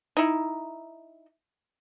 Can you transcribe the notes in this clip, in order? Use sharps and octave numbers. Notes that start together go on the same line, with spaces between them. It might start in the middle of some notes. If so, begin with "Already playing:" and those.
D#4 E4